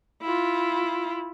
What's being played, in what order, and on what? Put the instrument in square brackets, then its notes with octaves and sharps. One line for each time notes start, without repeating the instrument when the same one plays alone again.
[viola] E4 F4